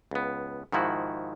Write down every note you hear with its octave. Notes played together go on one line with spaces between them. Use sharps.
C#2 B3
G#2 D#3 F3 E4 F#4